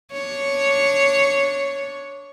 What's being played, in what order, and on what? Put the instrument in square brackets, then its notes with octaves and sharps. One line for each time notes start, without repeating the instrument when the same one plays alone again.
[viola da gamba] D4 C#5